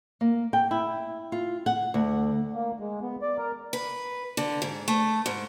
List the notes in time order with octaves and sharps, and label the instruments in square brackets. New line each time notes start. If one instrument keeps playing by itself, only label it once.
[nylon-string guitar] A#3
G5
E4
F4
F#5
D2
[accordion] A#3
G#3
B3
D5
A#4
[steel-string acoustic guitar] B4
D3
G#2
A3
G#2